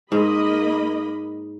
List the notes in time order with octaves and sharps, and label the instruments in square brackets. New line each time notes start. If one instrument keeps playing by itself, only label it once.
[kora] G#2 [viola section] A#3 D#5 B5